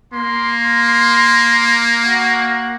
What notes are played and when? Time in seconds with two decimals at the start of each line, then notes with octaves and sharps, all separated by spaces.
0.13 A#3 C6
0.62 C6
2.04 F#4